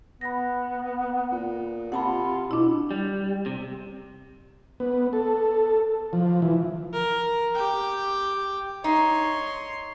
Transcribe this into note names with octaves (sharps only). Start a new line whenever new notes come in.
B3 B5 A#6
A#2
C3 F4 F#5 A5 B5
B2 D4 E4
G3
C3
B3
A4
F3
E3
A#4
G4 G5
D#4 C#5 C6